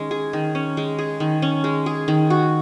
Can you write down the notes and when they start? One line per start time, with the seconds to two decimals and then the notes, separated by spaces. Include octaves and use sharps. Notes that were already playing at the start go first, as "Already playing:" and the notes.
Already playing: D#3 G#3 C#4
0.11 G#4
0.33 D#3
0.55 C#4
0.77 G#3
0.98 G#4
1.20 D#3
1.42 C#4
1.64 G#3
1.86 G#4
2.08 D#3
2.30 F#4